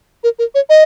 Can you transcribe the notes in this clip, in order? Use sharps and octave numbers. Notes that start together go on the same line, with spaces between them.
A#4
A#4
C#5
D#5